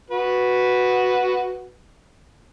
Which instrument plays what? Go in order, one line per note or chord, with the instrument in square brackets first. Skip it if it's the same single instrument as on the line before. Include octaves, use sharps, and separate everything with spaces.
[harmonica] F#4 B4